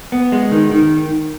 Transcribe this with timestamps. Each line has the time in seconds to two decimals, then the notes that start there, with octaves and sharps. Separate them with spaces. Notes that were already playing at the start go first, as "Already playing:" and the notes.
0.12 B3
0.32 G#3
0.52 D#3
0.71 D#3